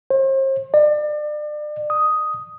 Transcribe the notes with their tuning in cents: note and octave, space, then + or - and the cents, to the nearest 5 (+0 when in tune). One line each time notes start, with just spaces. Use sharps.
C5 +40
D5 +35
D#6 +5